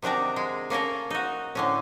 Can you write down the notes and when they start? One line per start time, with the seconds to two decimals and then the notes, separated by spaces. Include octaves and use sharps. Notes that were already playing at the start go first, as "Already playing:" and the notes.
0.02 C3 D#3 D4 F#4 A#5
0.36 G#3
0.70 A#3 C#4 A4 A#4
1.10 D#4 F#4
1.55 A2 D3 C#4